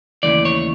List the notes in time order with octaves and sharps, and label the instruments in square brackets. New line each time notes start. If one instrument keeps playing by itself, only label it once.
[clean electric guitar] D#2 C#3 E3 A3 D5
C#5